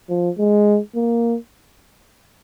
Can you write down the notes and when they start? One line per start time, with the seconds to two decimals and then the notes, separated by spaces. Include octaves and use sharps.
0.09 F3
0.38 G#3
0.95 A#3